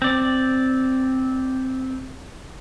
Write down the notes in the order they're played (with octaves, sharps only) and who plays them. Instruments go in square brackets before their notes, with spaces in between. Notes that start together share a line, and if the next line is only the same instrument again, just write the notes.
[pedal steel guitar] C4 D5